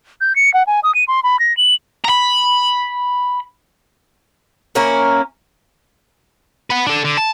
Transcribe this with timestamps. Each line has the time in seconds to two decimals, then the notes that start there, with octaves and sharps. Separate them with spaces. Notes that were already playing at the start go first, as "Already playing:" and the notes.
0.21 G6
0.36 C#7
0.54 F#5
0.67 G#5
0.83 D#6
0.95 D#7
1.08 C6
1.24 B5
1.39 A#6
1.57 F#7
2.05 A#5 B5
4.75 A#3 C#4 E4 A#4
6.70 B4 F#5
6.86 D4 A4
7.05 D3
7.17 A5